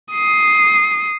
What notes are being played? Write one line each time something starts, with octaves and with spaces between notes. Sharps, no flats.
D#6 C7